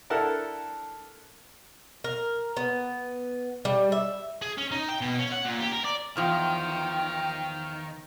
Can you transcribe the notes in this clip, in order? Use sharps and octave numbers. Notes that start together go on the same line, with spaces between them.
D4 E4 A4 A#4 F#5 A5
A#4
B3
G3
E5
G#4
C#4
D#4
G5
B2
C#4
F#5
A#2
G4
A#4
D5
E2 D#3 F3 G5 F6